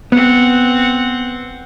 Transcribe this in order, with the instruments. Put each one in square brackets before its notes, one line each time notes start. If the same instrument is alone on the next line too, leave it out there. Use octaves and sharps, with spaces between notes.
[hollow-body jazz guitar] B3 [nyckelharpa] C4 F#5